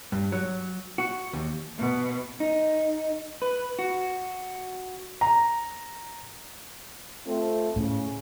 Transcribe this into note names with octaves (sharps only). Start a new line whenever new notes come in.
G2
F#3
F#4
D#2
B2
D#4
B4
F#4
A#5
A3 C4 F4
A2 C#3